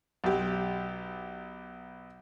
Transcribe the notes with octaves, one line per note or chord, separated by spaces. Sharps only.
B1 G4